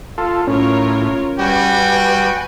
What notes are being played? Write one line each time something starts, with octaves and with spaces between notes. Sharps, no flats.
F4 A4
A2 C#4 F4 A#4 C#5
G3 F#4 B4 G5 G#5